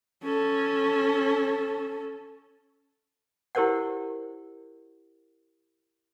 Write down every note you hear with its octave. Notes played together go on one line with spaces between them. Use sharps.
C#4 A4
E4 G4 A#4 C5 D5 F#5